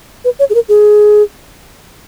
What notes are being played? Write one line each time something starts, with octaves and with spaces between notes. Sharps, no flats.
B4
C#5
G#4
A#4
G#4